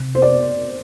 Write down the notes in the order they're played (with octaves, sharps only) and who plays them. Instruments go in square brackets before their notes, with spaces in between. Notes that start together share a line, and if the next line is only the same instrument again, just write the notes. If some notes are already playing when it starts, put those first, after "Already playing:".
Already playing: [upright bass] C3
[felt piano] C5
D5